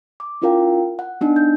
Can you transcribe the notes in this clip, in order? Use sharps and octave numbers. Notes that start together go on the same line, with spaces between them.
D6
C#4 E4 F4 A#4 F5 G5
F#5
B3 D4 D#4
G6